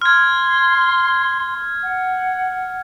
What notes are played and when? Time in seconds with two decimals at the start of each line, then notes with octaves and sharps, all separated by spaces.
0.02 C6 F6 G#6
1.83 F#5